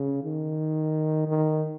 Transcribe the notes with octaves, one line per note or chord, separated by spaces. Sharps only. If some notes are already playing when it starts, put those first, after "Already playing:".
Already playing: C#3
D#3
D#3